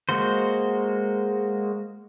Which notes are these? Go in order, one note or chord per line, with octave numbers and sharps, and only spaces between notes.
G#3 A#3 F#4 C5